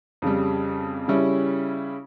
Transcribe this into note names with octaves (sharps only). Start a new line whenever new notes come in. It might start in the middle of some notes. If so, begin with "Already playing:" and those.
F2 C#3 G3
C#3 G3 C#4 E4